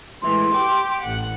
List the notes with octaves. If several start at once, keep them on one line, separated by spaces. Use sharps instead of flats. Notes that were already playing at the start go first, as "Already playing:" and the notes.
A2 E3 G#3 C6
G4 G5 D6
A1 F#5